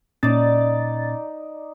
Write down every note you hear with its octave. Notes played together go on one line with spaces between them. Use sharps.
A#2 C#4 D#4 D5 A6